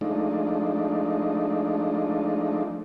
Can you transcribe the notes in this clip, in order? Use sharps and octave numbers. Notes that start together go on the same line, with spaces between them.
F3 G#3 A3 D4 D#4